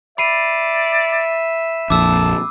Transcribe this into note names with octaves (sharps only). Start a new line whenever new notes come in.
D5 E5 B5 C7 D#7
A#1 F2 A5 D6 E6